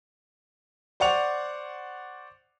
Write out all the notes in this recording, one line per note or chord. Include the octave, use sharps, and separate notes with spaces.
C5 D5 F#5 C#6 F7